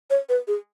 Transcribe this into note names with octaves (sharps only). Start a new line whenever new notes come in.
C#5
B4
G#4